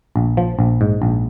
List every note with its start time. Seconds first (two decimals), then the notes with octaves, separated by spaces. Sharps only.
0.16 A#1
0.37 F3
0.59 A#1
0.81 G#2
1.02 A#1